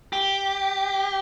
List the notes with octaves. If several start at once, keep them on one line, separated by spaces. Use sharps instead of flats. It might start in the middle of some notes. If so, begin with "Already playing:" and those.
G4